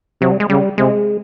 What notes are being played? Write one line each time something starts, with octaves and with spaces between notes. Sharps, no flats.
C3 F#3
G3
G#3
C#3 G3
C3 G#3